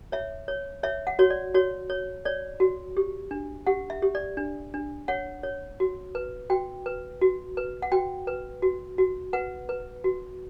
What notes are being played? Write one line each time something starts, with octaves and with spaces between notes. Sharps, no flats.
C#5 E5
C#5
C#5 E5
F#5
F#4 C#5
D5
F#4 C#5
C#5
C#5 D5
F#4
G4
D4
G4 F#5
E5
G4
D5
D4
D4
C#5 F#5
C#5
F#4
B4
F#4 G5
B4
F#4
B4
F#5
F#4 G5
B4
F#4
F#4
B4 F#5
B4
F#4